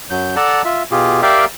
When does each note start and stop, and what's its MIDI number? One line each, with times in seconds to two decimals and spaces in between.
0.10 0.35 42
0.10 0.35 54
0.10 0.35 91
0.36 0.62 69
0.36 0.62 74
0.36 0.62 78
0.36 0.62 81
0.36 0.62 82
0.65 0.83 65
0.65 0.83 76
0.91 1.21 47
0.91 1.21 65
0.91 1.21 67
0.91 1.21 68
1.22 1.45 67
1.22 1.45 70
1.22 1.45 74
1.22 1.45 76
1.22 1.45 77
1.22 1.45 79